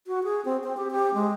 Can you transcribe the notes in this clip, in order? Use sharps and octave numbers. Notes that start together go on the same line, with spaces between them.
F#4
G#4
C4
C4
G4
G4
G#3